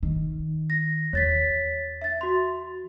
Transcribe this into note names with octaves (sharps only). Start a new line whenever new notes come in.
D#3
A#6
E2 C#5 A6 B6
E5 A6
F#4 C6